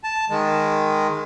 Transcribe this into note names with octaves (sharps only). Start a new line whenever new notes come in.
A5
D#3 G#3